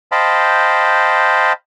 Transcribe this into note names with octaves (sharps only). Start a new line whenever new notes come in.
C5 D#5 F5 G5 A5 B5